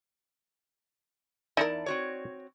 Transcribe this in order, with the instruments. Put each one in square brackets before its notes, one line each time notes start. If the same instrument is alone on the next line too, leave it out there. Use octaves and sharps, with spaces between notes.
[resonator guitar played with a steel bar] E2 A5 [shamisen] D#4 E4 A#4 [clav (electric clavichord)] D5
[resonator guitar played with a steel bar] C4 F#4 C#5